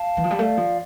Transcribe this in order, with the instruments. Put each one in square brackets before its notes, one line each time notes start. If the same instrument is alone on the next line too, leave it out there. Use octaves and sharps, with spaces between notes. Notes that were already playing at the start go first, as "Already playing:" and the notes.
Already playing: [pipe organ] F5 A5
[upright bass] E3
F3
G3
[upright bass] A3 [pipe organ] D5 F5
[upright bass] F3